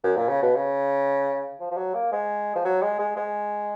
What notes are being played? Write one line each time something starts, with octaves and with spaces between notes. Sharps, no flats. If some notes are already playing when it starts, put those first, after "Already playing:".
F#2
A#2
C#3
B2
C#3
F3
F3
F#3
A#3
G#3
F3
F#3
G#3
G#3
G#3